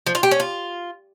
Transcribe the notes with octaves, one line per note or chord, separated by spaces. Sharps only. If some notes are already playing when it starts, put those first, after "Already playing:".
F3
F4
G4
C#4
F4